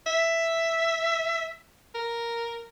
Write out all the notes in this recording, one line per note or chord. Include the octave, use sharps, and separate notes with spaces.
E5
A#4